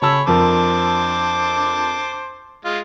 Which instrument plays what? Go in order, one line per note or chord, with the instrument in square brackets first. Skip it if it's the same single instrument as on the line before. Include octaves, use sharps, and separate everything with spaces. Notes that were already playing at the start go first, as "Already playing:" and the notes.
[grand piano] C#3 A5 E6 [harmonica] C#5 B5
[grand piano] F2 F3 A#4 [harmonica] C5 A5 D6
[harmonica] G#3 F4